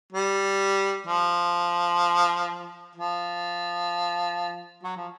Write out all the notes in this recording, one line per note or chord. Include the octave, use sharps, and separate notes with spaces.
G3
F3
F3
F#3
F3